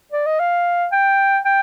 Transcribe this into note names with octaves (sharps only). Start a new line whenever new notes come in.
D5
D#5
F5
G5
G5